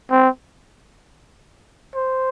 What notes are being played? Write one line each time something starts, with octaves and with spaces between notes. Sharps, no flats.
C4
C5